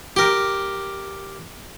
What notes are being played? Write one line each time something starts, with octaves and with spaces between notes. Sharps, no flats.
G4 A#4